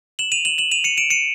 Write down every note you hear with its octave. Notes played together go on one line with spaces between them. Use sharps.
E7 F#7
D#7 F7
E7 F#7
E7 F#7
D#7 F7
C#7 D#7
D7 E7
C#7 D#7